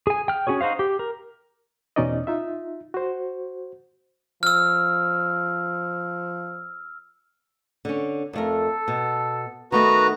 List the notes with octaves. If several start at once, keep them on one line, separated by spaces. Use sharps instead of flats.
G#4 G#5
G5 F6
C#4 E4 F#4 G#4 C#5
D#4 F#4 C5 F5
G4
A#4
E2 B2 C#4 D#4 D5 D#5
D#4 F4 E5
F#4 C5
F3 E6 F6
D3 C#4
F2 A3 A4 A#4
B2
D#3 A3 B3 F#4 B4 A#5